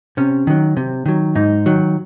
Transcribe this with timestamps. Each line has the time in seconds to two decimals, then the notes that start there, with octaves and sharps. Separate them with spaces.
0.17 C3 C#4
0.47 D#3 F#3
0.77 C3
1.06 D#3 F#3
1.35 G#2 D#4
1.66 D#3 F#3